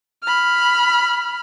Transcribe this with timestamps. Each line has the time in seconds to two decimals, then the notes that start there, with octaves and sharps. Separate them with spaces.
0.24 B5 F6